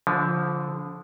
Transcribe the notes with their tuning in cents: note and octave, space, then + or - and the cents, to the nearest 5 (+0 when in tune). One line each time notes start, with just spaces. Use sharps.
D3 -30 F3 +0